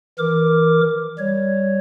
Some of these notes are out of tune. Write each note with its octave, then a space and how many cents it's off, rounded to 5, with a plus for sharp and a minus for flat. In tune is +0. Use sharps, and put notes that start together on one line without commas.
E3 -15 A#4 +0 D6 +0
G3 +0 C#5 +0